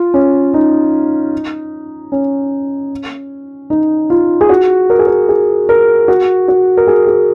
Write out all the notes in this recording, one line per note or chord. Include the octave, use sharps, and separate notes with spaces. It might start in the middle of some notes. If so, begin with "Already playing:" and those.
Already playing: F4
C#4
D#4
C#4
D#4
F4
G#4
F#4
A#4
G#4
A#4
G#4
A#4
F#4
F#4
A#4
G#4
G#4